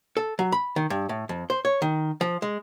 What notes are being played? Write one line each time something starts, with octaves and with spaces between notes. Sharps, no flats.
A4
F#3
B5
D#3
G2
A2
F2
C5
C#5
D#3
F3
G#3